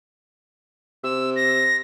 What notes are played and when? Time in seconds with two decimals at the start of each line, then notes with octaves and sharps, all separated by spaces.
1.04 C3 E6
1.36 A#6